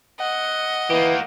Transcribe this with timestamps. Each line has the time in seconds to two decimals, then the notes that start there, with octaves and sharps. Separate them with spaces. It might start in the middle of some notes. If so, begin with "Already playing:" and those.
0.20 D#5 F#5
0.90 E3 A#3 G4